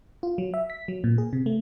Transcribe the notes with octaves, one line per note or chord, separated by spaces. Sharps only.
F4
F#3
E5
B6
F#3
A#2
G#4
C3
A3